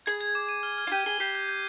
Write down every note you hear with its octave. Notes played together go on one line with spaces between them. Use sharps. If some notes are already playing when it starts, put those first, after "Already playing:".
G#4 G#6
G#6
D6
D#7
F6
F6
F4
G4 D#7
G#4 G7
G4 C7
G6
G6